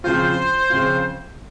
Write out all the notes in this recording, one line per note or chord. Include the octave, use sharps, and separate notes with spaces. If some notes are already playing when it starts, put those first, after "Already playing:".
C#3 F3 C4 F4 C5
C#3 F3 C4 F4